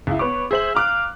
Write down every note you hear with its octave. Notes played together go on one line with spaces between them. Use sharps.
C#2 E4
B3 B4 C#5 D6
G#4 C5 E5 F#7
F5 A#5 D6 F#6